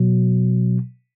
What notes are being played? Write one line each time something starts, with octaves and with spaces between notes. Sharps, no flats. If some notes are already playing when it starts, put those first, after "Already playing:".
Already playing: B2 F#3